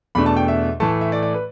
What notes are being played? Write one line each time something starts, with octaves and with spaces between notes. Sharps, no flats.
E2 B2 A3 D4 B5
A5
G5
E5
A2 E3 A3 A5
E5
D5
D5
B4